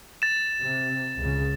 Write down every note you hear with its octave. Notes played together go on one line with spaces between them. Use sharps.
A6 E7
C3
C#2 C#3